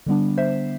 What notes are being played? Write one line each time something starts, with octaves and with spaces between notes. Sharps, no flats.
D3 G3 B3 D4
C5 E5